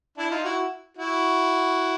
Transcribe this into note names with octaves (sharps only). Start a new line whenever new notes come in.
D4 E4
D#4 F4
E4 F#4
E4 F#4